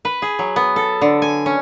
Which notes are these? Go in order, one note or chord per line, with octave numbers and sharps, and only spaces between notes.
B4
G#4
F#3
B3
A4
D3
G#5
C#4